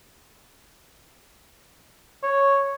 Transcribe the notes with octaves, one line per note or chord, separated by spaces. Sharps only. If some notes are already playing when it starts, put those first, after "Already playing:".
C#5